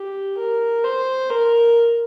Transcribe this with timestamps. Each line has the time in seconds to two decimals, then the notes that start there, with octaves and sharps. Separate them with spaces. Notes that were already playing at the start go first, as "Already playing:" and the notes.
Already playing: G4
0.38 A#4
0.84 C5
1.30 A#4